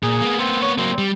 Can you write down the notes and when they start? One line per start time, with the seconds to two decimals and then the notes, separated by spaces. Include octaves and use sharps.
0.03 A#2 G#4
0.22 A#3 B3
0.39 C4
0.62 C#5
0.78 F#3 A#3 C4
0.98 G3